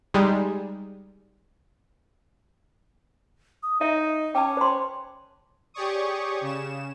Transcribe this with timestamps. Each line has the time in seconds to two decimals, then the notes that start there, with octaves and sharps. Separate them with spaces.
0.14 G3 G#3 D#4
3.63 D#6
3.81 D#4 D#5 E5
4.35 C#4 G5 A5 D6
4.57 C5 C6
5.74 G4 G#4 C#5 D5 C#6 D#6
6.41 C#3 E7